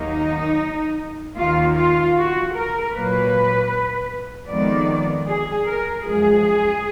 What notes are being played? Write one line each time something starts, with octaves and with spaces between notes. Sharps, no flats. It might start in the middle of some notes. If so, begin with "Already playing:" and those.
Already playing: D#2 D#3 F#3 A#3 D#4
D#2 D#3 A#3 F4
F4
F#4
A#4
A#2 F#3 A#3 B4
F2 D#3 G#3 B3 D5
G#4
A#4
F#2 F3 G#3 G#4